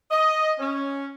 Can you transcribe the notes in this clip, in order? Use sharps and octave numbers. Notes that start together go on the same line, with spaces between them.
D#5
C#4